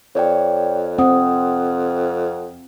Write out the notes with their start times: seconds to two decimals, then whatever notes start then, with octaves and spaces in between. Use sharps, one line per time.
0.15 F2 C#5 D5 G5
0.98 C4 F#5 D#6